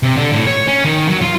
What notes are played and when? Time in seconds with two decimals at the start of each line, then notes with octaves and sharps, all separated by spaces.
0.03 C3
0.16 D3
0.32 A2
0.47 C#5
0.67 C#4
0.85 D#3
1.09 F#3
1.22 F4